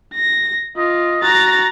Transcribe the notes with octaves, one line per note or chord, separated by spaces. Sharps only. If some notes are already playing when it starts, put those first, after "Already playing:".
A#6
F4 D#5
F#4 A#5 A6